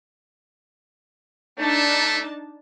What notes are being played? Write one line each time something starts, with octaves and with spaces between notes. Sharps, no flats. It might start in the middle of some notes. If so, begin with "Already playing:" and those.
A3 D4 D#4 A5